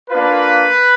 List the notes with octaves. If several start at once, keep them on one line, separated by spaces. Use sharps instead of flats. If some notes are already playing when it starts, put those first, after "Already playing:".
A#3 D4 F4 B4